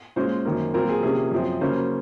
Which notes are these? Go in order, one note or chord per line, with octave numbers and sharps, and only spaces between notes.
A#2 G#3 C#4 C5
F#2 D#3 A#3
A#2 F#3 C4 A#4
G#4
C3 F3 A#3 C#4 G#4
F#2 F3 C4
C#3 F#3 A#3 C#4 C5